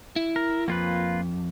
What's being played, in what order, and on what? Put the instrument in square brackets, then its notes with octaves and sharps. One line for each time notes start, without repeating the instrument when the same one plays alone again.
[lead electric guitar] E4
[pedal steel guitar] A#4
[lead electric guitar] F2 [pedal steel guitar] A#3 F4 B4